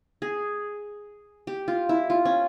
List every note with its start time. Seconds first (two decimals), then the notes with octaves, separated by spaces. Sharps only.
0.22 G#4
1.47 G4
1.68 F4
1.89 E4
2.10 F4
2.25 C#4